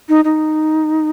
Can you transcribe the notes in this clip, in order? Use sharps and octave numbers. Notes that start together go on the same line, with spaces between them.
D#4
D#4